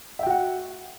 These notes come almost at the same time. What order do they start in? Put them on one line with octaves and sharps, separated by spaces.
E5 G5 F#4 F#5